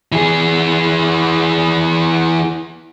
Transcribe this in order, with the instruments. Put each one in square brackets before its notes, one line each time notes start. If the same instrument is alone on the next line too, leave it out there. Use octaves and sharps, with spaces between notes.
[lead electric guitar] E3 G#4